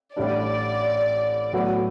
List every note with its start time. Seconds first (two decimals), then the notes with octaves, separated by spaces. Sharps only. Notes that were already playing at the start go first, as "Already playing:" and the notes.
0.16 A1 A2 G3 D4 D5
1.53 A2 F#3 B3 F#4